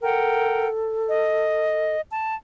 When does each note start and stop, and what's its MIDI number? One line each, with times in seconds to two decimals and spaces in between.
0.02 1.96 69
0.02 0.68 70
0.02 0.68 78
0.02 0.68 79
1.09 2.00 75
2.10 2.34 81